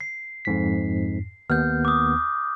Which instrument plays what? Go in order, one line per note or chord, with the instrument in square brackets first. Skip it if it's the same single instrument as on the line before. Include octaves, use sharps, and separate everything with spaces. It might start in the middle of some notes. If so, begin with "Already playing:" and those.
[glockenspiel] C7
[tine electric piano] F2 G#2 B6
[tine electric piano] D#2 B3 [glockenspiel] F6 G6
[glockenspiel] D6 D#6